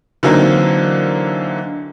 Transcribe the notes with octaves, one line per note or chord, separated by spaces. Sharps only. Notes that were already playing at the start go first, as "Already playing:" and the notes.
D3 E3 F#3 A#3 C4 D#4